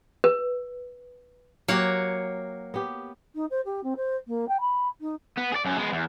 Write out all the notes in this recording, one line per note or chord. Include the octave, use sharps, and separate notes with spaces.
B4
F#3 A#3 G4 C#5 F#5
B3 G4
D#4
C5
G4
C4
C5
A#3
G5
B5
D#4
B3
G#4 D5
F#2 C#4
G#3 B3
E2